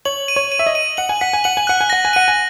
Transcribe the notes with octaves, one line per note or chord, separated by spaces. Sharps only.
C#5 F#7
D#7
C#5
D#7
E5
D#5
D#7
F#5 F#7
G#5
F#5 B6
G#5
F#5 F#7
G#5
F#5 F#6
G#5
F#5 A#6
G#5
F#5 D#7
G#5